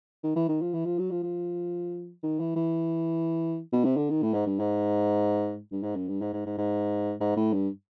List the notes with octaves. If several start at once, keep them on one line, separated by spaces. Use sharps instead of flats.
D#3
E3
D#3
F3
E3
F3
F#3
F3
F3
D#3
E3
E3
B2
C3
D3
D#3
A2
G#2
G2
G#2
G2
G#2
F#2
G2
G#2
G#2
G#2
G#2
G#2
A2
G2